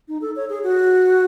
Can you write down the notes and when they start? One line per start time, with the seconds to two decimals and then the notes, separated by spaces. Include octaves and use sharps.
0.08 D#4
0.21 A4
0.36 C#5
0.50 G#4
0.63 F#4